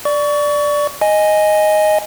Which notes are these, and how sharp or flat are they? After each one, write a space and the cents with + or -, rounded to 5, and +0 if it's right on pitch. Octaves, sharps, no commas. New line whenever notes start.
D5 +0 C#6 +25
D#5 +0 G#5 +0